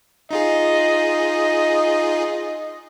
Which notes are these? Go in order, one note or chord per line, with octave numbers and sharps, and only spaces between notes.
D#4 F4 G#4 D#5